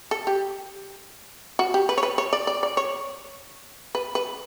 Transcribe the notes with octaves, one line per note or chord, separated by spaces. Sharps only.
A4
G4
F#4
G4
B4
C#5
B4
C#5
D5
D5
D5
C#5
B4
B4